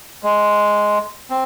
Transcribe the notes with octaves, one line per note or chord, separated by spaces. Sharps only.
G#3
C4